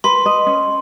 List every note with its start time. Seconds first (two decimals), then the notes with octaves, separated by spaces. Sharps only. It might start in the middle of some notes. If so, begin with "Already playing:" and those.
0.04 B4 C6
0.26 D#5
0.47 C#4